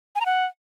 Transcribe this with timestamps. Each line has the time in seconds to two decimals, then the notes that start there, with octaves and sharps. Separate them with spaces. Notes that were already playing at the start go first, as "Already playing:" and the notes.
0.15 G#5
0.21 A#5
0.26 F#5